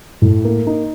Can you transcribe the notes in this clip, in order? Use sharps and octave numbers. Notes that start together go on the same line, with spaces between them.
A2
A#3
D#4